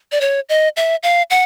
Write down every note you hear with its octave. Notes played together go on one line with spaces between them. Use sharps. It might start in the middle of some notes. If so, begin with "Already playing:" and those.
D5
C#5
D#5
E5
F5
F#5